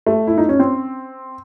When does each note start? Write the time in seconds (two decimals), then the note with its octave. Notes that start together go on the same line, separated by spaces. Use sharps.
0.07 A3
0.27 E4
0.38 D#4
0.49 C#4
0.59 C4